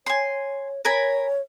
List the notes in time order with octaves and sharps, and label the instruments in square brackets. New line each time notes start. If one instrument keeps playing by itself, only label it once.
[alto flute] C#5 [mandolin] G#5 C6
[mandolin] A#4 G#5 B5 [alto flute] C#5